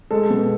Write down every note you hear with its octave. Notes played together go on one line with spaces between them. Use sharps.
G#3 A4
B2